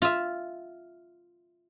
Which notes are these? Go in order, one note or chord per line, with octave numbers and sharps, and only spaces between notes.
F4 E5